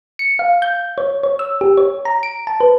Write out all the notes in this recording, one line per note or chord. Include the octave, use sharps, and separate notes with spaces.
C#7
F5
G6
C#5
C#5
E6
G4
C#5
A#5
D7
A5
B4